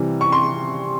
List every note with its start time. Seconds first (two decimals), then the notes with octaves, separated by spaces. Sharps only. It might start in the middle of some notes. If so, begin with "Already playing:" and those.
Already playing: C3 E3 G3
0.21 C#6
0.32 C6